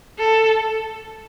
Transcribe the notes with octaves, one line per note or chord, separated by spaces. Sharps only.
A4